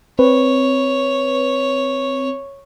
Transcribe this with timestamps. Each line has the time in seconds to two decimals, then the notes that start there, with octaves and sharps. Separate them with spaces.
0.19 C4 B4 C#5